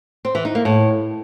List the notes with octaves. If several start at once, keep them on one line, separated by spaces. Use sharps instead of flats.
C4
E3
D#4
A#3
A2